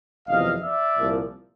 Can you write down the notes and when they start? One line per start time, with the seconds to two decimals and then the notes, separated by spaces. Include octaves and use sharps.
0.28 F#1 E2 C3 F3 D#5 F5
0.62 D5 E5
0.96 C2 A#2 F3